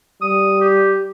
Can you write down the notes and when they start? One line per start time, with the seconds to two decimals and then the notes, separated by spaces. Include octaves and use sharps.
0.22 G3 D#6
0.61 G4